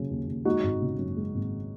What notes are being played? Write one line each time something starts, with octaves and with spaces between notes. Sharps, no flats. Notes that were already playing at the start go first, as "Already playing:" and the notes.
Already playing: C#3 F#3
D#2
D#2
G#3 D#4 F#4
G#1
C#3
F#2
G#3
G#1